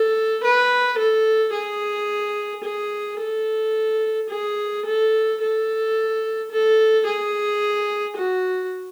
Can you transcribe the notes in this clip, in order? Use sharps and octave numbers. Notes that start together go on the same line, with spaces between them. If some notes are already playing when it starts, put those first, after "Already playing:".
Already playing: A4
B4
A4
G#4
G#4
A4
G#4
A4
A4
A4
G#4
F#4